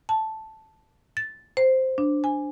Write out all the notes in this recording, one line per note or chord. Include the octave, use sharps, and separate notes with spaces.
A5
A6
C5
D4
G#5